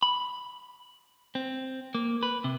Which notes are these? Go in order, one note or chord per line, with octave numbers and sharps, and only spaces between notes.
B5
C4
A#3
B4
C3